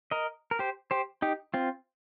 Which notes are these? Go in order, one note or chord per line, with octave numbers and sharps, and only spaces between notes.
A#4 D#5
A#4
G4 C5
G4 C5
D#4 G4
C4 F4